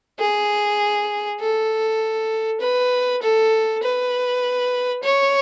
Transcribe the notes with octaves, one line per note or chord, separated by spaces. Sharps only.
G#4
A4
B4
A4
B4
C#5